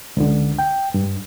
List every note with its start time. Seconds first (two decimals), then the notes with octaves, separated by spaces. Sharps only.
0.17 C#2 D3
0.59 G5
0.94 G2